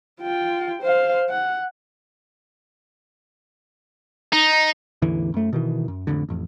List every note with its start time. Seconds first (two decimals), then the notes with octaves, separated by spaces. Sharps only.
0.21 F4 G5
0.82 C5 F5
1.30 F#5
4.33 D#4
5.02 A1 E2 D3 E3
5.34 F#2 A3
5.53 B2 D#3 E3
5.88 F#2
6.07 A1 F2 G#2 D3
6.29 A1 F2